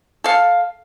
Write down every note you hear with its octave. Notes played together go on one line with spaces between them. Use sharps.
A4 F5